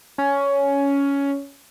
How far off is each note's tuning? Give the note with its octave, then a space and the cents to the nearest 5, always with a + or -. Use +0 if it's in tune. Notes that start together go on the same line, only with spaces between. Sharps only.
C#4 +10